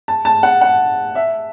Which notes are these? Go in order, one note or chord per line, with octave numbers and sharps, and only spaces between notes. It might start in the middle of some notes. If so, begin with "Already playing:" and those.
A5
A5
F#5
F#5
E5